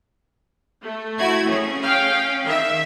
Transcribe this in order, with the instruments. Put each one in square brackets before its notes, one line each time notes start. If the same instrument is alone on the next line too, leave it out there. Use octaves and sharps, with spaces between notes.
[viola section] A3
[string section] E4 F#4 G#6
C#4 G#4
[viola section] F5 G5
[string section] D#3 [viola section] E5